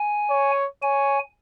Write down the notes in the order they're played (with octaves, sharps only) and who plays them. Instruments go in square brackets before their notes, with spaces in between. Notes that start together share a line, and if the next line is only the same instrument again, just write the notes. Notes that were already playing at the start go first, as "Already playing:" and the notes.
Already playing: [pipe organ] G#5
[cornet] C#5
[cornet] C#5 [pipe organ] G#5